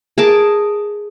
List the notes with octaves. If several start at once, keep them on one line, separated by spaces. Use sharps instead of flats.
G#4 A#4 A5 D6